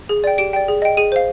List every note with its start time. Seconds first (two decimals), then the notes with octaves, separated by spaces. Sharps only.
0.09 G#4
0.24 D5 G5
0.38 G4 D7
0.53 D5 G5
0.68 G#4
0.82 D#5 G5
0.97 G#4 D#7
1.12 C5 F5